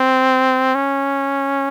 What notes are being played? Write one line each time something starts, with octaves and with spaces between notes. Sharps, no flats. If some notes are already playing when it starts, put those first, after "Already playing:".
Already playing: C4
C#4